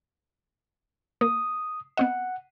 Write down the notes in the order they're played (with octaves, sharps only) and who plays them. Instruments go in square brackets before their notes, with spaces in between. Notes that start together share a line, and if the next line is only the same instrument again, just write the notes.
[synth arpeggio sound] A#3 [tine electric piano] D#6
[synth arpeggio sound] B3 C4 D#5 [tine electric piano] F#5